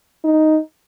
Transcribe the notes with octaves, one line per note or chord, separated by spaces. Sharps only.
D#4